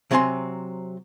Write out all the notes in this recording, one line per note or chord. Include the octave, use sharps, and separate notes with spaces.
C3 F#3 C4 F5 G#5 C6